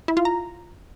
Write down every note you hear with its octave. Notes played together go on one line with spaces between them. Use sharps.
E4
F4
A#5